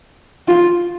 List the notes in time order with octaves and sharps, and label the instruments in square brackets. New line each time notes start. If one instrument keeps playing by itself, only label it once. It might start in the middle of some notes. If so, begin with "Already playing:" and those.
[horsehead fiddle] F4